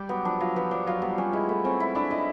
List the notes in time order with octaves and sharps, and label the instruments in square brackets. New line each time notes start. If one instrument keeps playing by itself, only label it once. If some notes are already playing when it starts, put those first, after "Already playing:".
Already playing: [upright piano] G3 [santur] G4 D5
[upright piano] F#3 [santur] B3
[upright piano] F3 [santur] D4
[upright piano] F#3 [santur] F4
[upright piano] F3 [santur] B3
[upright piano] F3 [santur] D4
[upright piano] F#3 [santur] F4
[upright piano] G3 [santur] B3
[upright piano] G3 [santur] C#4
[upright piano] G#3 [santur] E4
[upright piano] A3 [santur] E4
[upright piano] C4 [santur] C#4
[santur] E4
[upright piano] D4 [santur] E4
[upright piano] D#4 [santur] E4